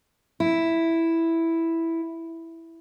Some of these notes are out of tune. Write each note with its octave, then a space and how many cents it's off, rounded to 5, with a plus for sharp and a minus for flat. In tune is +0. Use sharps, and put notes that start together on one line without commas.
E4 +0